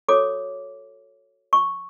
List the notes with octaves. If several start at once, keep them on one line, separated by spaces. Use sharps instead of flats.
F#4 A4 C#5 D6
C#6